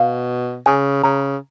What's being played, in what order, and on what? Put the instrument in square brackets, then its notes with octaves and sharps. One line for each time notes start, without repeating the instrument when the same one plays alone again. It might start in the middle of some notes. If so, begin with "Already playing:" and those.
Already playing: [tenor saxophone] B2 [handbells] F5
[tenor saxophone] C#3 [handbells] G#5
[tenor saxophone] C#3 [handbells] A#5